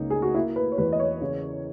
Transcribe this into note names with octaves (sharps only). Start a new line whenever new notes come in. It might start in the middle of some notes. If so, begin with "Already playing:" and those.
Already playing: C#2 A#3 D#4
G#4
F#4
A#3 E4
B4
C#5
E2 B4
D#5
C#5
C#3